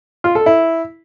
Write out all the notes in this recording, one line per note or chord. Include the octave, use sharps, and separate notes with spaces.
F4
A4
E4